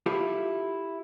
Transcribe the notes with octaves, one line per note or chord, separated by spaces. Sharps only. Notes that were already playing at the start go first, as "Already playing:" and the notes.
E4 F4 G4 A4 C5 E5